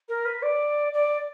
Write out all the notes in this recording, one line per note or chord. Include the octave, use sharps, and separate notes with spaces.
A#4
B4
D5
D5